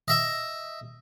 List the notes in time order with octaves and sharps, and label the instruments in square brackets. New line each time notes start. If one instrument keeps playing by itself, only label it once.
[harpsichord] D#5 E5